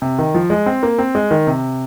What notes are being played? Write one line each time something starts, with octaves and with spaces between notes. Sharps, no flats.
C3
D#3
F3
G#3
C4
A#3
C4
G#3
D#3
C3